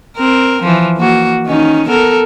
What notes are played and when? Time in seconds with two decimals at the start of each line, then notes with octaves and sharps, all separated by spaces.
0.17 C4 A#4
0.62 E3 F3
0.97 A#3 F#4
1.46 D#3 C#4 D#4
1.88 B3 A4 A#4